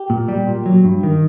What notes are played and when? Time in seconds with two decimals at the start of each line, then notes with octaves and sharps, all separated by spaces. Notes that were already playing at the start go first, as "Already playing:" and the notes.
Already playing: G4
0.10 A#2
0.28 G3
0.47 A#2
0.66 F#3
0.85 G2
1.03 D#3